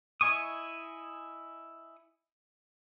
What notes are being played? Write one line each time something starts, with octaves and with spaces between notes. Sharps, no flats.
E4 D#5 G#5 C#6 D#6